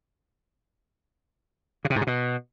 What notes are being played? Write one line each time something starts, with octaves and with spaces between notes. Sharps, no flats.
C#3
C3
G#2
C3
B2